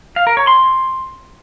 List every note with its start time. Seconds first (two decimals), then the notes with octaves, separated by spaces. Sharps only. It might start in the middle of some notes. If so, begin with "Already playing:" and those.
0.16 F5
0.27 A#4
0.37 C#5
0.47 C6